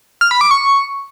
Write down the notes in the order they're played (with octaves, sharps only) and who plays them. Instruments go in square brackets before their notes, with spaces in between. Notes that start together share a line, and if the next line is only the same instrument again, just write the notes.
[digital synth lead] F6
B5
D6
C#6